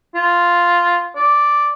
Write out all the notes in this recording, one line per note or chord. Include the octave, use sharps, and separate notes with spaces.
F4
D5